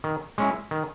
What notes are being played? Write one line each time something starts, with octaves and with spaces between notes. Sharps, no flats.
D#3
G#3 C#4 E4
D#3